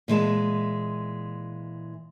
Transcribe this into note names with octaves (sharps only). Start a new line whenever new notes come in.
A#2 E3 G#3 A5